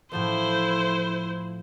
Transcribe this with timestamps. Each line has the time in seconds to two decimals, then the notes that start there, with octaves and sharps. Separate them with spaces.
0.12 A2 F3 A3 E4 C5